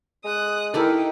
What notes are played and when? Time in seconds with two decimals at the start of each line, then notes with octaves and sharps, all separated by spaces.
0.25 G#3 D#6 F#6
0.74 D#4 E4 G4 A4 A#4 D5 G5